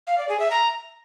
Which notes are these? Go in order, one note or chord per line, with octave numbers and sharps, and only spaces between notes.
F5
D5
G#4
E5
A#5